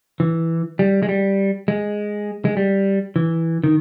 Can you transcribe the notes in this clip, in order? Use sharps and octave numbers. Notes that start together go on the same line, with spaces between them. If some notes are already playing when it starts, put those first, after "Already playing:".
E3
G3
G#3
G3
G#3
G#3
G3
E3
D#3